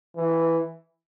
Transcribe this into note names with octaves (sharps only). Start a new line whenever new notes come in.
E3